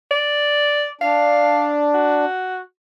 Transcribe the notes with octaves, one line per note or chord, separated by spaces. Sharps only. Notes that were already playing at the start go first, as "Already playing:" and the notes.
D5
D4 F5
F#4